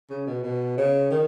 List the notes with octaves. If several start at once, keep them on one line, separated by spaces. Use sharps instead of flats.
C#3
B2
B2
C#3
D#3